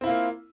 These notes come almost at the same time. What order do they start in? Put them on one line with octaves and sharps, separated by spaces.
C4 E4 F4 A#3